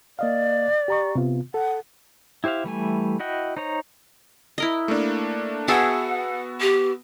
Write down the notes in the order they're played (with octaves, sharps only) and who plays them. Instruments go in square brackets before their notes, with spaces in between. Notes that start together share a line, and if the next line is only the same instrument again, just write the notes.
[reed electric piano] A#3 D#5 F5 [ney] D5
[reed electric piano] G4 A#5 C#6
C3 B3 F4
[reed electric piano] A4 [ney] F#5
[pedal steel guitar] E4 G4 C5 E5 F5
E3 G3 A3 G#5
E4 F#4 D#5 F#5 G5
D#4 C5 C#5 A#5
[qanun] E4 A#4 D#5
[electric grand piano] A3 A#3 D4
[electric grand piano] B3 F#4 E6 [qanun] G#4 E5 A5 [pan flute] F#5
[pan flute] G4